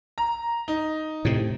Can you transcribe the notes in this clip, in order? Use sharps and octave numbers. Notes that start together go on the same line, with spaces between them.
A#5
D#4
A2 C3